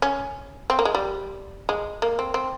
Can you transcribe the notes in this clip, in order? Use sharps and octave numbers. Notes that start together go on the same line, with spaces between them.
C#4
C4
A#3
G#3
G3
G#3
A#3
C4
C4